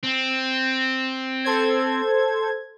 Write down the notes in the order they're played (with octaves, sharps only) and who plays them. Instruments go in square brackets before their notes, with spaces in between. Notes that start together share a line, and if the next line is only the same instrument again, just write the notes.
[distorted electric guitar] C4
[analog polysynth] A4 C5 G#6